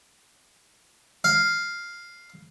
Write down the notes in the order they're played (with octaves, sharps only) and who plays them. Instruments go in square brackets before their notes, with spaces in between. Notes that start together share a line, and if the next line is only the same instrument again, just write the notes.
[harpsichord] F5